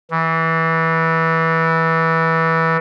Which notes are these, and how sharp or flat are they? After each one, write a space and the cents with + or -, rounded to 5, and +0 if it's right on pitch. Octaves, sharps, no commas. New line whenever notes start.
E3 -15